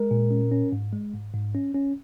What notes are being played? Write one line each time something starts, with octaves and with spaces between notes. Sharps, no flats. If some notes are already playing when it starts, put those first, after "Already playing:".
Already playing: G#3 A#4
A#2
C#4
C#4
G#2
G#3
G#2
G#2
C#4
C#4